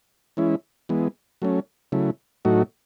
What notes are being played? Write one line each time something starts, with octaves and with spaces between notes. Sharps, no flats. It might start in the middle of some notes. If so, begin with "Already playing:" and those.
E3 G#3 C#4 E4
E3 G#3 B3
F#3 A3 C#4
C#3 F#3 A3 E4
A2 F#3 A3 D#4 F#4